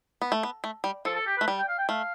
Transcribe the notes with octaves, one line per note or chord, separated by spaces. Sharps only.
B3
A3
B3
A3
G3
F3 A4
A4
G4
A3 B4
G3
G5
F5
G5
A3 F5